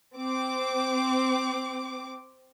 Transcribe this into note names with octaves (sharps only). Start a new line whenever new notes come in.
C4 D6